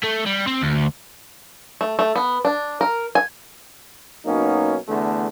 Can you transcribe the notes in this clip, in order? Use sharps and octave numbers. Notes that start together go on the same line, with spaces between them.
A3
G3
C4
D2
A3
A3
B3
D4
A#4
G#5
B2 F#3 A#3 C#4 D#4
E2 D3 A3